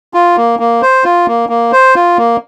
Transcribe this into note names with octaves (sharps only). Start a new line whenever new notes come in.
F4
A#3
A#3
C5
F4
A#3
A#3
C5
F4
A#3